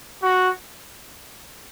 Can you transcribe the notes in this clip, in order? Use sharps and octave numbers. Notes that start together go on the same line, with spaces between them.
F#4